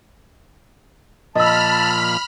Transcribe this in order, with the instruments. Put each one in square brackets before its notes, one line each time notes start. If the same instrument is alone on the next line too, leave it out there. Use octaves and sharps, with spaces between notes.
[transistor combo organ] A#2 F3 [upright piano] D#5 E6 [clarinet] A5 [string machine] B5 F6